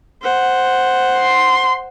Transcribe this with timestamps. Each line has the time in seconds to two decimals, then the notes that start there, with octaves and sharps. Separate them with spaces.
0.22 C5 F#5
1.17 C6